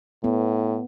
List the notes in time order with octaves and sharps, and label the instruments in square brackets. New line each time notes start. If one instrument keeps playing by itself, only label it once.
[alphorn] A2 [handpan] B3